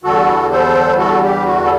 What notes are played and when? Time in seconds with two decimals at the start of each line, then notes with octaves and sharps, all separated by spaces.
0.03 E2 D3 G3 F#4 A4
0.51 A4 C5
0.98 F#4 A4
1.22 G4
1.45 F#4
1.63 A4